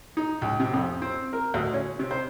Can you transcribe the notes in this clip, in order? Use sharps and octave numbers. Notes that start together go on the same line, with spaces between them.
D#4
C#2
C3
F2
C4
A#4
D2
C#4
C3
C5